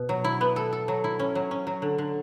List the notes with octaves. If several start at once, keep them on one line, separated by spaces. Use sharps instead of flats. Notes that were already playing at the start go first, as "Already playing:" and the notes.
Already playing: B2
F#3
E4
B3
A4
A4
F#3
E4
C#4
F#3
C#4
F#3
D3
D3